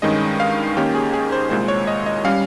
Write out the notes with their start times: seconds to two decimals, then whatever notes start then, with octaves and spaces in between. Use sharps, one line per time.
0.02 G2 D#3 G#3 C#4 D#5
0.40 F5
0.77 D#2 D#3 A#3 C#4 G4
0.95 G#4
1.13 G#4
1.32 C5
1.50 C2 A#2 G#3 C5
1.68 C#5
1.87 D#5
2.06 D#5
2.25 G3 C#4 F5